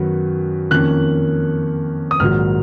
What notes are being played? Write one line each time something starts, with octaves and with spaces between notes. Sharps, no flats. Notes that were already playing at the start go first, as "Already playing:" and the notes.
Already playing: F#2 D#3 F#3 B3
F2 D#3 A#3 C#4 F#6
D#6
A#1 G#2 D#3 F#3 F6